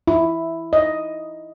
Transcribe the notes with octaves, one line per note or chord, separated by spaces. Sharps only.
E4
D#5